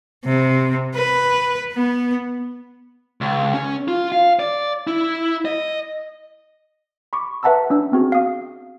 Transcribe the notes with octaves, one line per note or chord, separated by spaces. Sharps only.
C3
B4
B3
C#2
C#4
F4
F5
D5
E4
D#5
B5 C#6 D6
B4 E5 F#5 A5 A#5 E6
C#4 D4 E6
B3 C4 F#4 G#4
F5 D#6